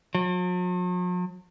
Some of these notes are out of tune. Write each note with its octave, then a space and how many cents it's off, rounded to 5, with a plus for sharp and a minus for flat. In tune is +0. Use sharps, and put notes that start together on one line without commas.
F#3 -45